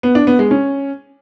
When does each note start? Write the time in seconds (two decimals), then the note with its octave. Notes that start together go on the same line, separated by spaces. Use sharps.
0.03 B3
0.15 D4
0.27 B3
0.39 G#3
0.51 C#4